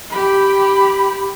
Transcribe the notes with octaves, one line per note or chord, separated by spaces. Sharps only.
G4 B5